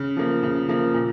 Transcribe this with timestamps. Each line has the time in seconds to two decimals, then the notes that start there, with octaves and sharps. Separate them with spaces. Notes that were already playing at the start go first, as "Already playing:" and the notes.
Already playing: C#3
0.17 F3 A#3
0.43 C#3
0.68 F3 A#3
0.94 A#2